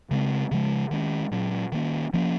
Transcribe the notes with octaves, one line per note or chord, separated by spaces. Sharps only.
C#3 G#3 C4
C#3 F3 G#3
D#3 G#3 C#4
A#2 F#3 C#4
D#3 A#3 C#4
F3 A#3 C#4